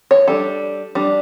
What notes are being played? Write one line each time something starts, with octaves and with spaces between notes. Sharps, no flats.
C#5
G3 D4 A4
G3 D4